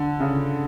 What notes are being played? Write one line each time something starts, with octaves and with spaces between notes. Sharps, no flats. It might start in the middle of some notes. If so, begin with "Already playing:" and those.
Already playing: D3
C#3